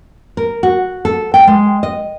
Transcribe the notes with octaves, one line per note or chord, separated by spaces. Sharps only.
A#4
F#4
A4
G5
G#3
D#5